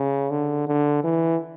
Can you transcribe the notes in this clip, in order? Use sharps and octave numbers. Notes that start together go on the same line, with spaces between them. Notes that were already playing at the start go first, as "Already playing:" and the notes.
Already playing: C#3
D3
D3
E3